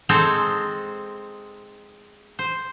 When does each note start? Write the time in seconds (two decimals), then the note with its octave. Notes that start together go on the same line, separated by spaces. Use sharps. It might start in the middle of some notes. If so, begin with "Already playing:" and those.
0.09 G#3 C4 D#4 A4 C5
2.39 C5